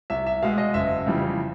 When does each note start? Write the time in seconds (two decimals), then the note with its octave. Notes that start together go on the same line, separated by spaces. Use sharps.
0.10 C2 E5
0.26 E5
0.42 B2 G#3 F5
0.58 D#5
0.74 F#1 E5
1.07 F2 C#3 E3 G3